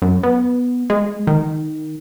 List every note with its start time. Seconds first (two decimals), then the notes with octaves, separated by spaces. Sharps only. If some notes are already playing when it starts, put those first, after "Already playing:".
0.02 F#2
0.23 B3
0.90 G#3
1.27 D#3